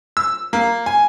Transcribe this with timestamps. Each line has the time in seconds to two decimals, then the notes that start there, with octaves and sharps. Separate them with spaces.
0.17 E6
0.53 A#3
0.86 G#5